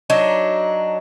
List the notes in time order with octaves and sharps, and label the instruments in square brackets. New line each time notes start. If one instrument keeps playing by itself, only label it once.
[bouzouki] F#3 D4 D#4